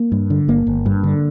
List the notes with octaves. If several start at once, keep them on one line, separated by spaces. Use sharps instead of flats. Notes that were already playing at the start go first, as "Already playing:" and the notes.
Already playing: A#3
G2
D3
G1 A#3
G1
G2
D3